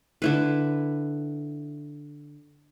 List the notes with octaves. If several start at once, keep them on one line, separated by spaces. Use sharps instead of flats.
D3 E4 B4